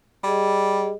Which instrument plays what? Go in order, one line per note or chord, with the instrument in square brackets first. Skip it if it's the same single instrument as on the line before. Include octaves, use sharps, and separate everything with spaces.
[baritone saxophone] G3 [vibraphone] G4 G#4 D#5